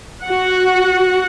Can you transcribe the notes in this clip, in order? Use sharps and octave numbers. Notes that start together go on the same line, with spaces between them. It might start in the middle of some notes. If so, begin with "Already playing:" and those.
F#4 F#5